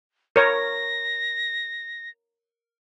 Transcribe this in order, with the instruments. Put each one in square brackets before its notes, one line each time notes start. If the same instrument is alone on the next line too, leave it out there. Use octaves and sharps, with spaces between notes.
[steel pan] A#4 C#5 [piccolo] A#6